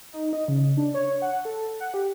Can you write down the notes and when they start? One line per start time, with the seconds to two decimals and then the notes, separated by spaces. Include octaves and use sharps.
0.13 D#4
0.33 D#5
0.48 C#3
0.77 D4
0.94 C#5
1.22 F#5
1.45 A4
1.80 F#5
1.94 G4